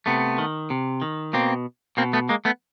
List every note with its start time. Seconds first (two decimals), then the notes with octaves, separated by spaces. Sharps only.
0.06 C3 A3 B3
0.38 D#3
0.70 C3
1.02 D#3
1.33 B2 A#3 C4
1.97 B2 A#3 C4
2.13 A3 B3
2.29 G#3 A#3
2.45 A3 B3